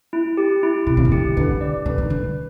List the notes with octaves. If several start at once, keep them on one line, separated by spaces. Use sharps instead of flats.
E4
G4
E4
C3 E4
C3
C#3
D3 G4
D3 B4
D5
D3 B4
D#3
D3 B4